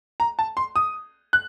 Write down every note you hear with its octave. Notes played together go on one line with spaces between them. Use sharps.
A#5
A5
C6
D#6
F#6